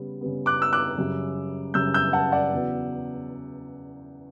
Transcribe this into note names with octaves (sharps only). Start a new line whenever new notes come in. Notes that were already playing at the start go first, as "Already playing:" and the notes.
Already playing: C#3 G3 B3
C#3 G3 B3
D6 F#6
E6
D6 F#6
F#2 C#3 G3
F#2 C#3 G3 E6 G6
E6 G6
F#5 A5
D5 F#5
E2 C#3 F#3 B3